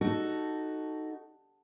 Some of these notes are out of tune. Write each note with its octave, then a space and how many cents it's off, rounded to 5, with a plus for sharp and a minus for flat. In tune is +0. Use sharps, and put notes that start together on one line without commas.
D#4 +0 F#4 +5 A4 +0